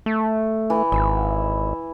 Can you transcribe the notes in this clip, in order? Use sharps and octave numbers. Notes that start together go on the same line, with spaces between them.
A3
E3
G#1 E5